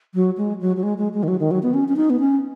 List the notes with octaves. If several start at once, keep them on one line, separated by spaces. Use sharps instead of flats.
F#3
G#3
F#3
F#3
G#3
G#3
G#3
D#3
F#3
D#3
F#3
B3
C#4
C#4
D#4
B3
C#4